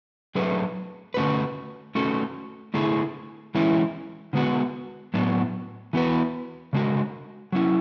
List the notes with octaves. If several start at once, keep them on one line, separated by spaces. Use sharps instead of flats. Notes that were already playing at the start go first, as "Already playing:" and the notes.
F#3 A3 D4 G#4 B4
D3 A3 C#4 F#4 B4
A3 C#4 F#4 A4
D3 A3 E4 G#4
E3 G#3 C#4 E4
D3 G#3 B3 F#4
A2 F#3 B3 D4
E3 B3 F#4 B4
C#3 G#3 D4 F#4
F#3 C#4 E4